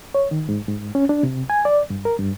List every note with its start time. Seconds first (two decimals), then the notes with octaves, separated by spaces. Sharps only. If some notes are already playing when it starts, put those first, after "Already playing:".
0.15 C#5
0.31 D#3
0.49 G#2
0.68 G#2
0.95 C#4
1.09 D4
1.23 C3
1.50 G#5
1.65 D5
1.90 G2
2.05 A#4
2.19 G2